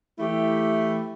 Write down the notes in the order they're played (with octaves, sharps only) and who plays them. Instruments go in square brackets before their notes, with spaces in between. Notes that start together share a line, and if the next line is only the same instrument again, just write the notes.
[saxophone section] E3 A3 E4 G4